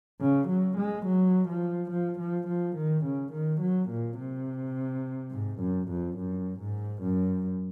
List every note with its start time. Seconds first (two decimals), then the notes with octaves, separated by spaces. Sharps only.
0.20 C#3
0.48 F#3
0.77 G#3
1.06 F#3
1.48 F3
1.91 F3
2.19 F3
2.47 F3
2.76 D#3
3.04 C#3
3.33 D#3
3.61 F#3
3.89 A#2
4.18 C3
5.31 G#2
5.60 F#2
5.88 F2
6.17 F#2
6.59 G#2
7.02 F#2